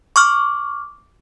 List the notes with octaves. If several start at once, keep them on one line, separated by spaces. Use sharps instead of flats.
C#6 D6 F6